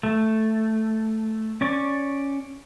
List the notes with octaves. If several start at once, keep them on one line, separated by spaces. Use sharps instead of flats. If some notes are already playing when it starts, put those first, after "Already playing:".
A3
C#4 D5 C#6